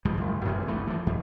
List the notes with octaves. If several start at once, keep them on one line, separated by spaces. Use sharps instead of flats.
C#2 G#2 F3 G3
F#1
A1 F#2 C3 G#3
G#1 D2 E3 A3
E3 F3
F2